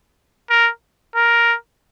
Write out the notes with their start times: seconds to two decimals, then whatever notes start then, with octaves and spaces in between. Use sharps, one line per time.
0.50 A#4
1.15 A#4